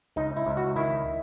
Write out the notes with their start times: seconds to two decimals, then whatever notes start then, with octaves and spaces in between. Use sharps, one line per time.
0.16 C#2 D#4
0.37 E4
0.46 C#2
0.57 F#4
0.76 D#3 E4